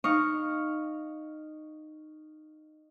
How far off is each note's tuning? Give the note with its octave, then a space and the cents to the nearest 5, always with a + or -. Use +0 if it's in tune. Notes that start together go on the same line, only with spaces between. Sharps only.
D#4 -15 F5 +0 C#6 +0